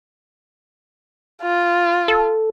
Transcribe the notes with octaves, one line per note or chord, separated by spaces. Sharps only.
F4
A4